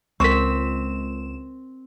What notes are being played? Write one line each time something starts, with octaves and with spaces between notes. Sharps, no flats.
C#2 C4 A#4 C#6 B6 E7